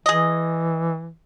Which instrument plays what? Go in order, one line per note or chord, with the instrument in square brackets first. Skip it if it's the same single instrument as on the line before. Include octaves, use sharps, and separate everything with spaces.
[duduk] E3 [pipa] G#4 D#5